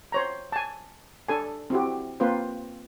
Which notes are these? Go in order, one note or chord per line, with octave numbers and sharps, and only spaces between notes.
C5 C#5 A#5
G#5 A5
D4 A4 G#5
C4 E4 F#4 G4
A#3 C4 F4 B4 C5